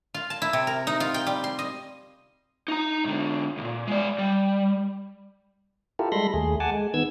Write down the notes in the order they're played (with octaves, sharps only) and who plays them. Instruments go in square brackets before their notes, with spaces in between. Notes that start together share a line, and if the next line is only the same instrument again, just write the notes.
[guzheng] F4
A5
E4
C3
A#4
D#4
F4
G5
G3
C6
D#5
[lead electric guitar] D#4 A#5
G#2 D3
C#2 A#2
G#3 D5
G3
[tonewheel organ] E4 F4 G4 A4 A#4
G3 G#3 A4 B5 C6 A#6
D#2 A3 G#4
F#5 G#5 A5 D6
G#3
D#3 B3 E6 G#6